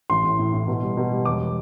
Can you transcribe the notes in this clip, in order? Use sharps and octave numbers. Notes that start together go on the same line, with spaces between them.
A1 C6
A2
A2
A2
B2
G3
B2
G3
E1 D6